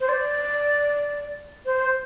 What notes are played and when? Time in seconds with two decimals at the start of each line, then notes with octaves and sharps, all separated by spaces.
0.01 C5
0.09 D5
1.66 C5